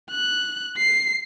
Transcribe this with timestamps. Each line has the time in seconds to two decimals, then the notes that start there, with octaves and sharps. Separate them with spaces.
0.11 F#6
0.77 C7